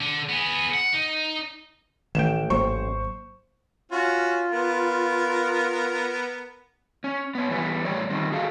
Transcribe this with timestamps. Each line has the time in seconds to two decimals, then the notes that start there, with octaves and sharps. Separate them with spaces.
0.01 D3
0.29 B3 G#4
0.74 F#5
0.94 D#4
2.15 A1 D#3 A3 G5 E7
2.50 G#1 F#3 A#3 C5 C#6
3.92 C#4 F4 F#4
4.51 B3 A#4
7.04 C#4
7.35 B3 C#5
7.50 E3 G3 A3 B3
7.85 A2 G3 C#5 D5
8.10 D#3 G3 C4
8.32 F#4 G#4 A4 F5